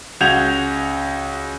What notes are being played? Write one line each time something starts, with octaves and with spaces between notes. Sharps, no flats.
C#2 F#4 G6 G#6 F7